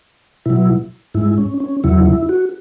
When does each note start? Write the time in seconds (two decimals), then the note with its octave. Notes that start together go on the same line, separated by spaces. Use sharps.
0.46 B2 F#3 E4
1.14 G#2 G#3 E4
1.38 C#4
1.60 C#4
1.84 E2 C#3 F#3 E4
2.06 E4
2.29 F#4